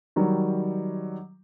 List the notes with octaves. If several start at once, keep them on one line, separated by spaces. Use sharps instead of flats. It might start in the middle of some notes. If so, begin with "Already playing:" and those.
D#3 F#3 G3